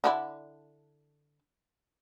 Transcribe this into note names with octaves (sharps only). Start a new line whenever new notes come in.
D3 D4 E4